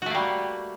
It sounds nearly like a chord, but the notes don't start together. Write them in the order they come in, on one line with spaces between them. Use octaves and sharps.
F#4 A3 A#3 G3